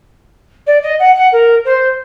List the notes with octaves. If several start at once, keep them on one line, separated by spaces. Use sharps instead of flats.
D5
D#5
F#5
F#5
A#4
C5